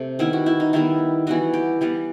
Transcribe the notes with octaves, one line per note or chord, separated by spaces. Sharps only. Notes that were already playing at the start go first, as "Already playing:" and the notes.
Already playing: C3 A3
D#3 G3 B3 E4
F#4
E4
D#4
D#3 G3 B3 E4
E3 G3 B3 F#4
G4
E3 G3 B3